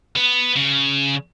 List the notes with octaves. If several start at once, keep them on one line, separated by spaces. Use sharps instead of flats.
B3
C#3